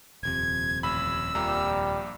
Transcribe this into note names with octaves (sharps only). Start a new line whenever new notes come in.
D#1 F2 C3 G#6
A1 B5 E6
A#1 A#2 G3 A#5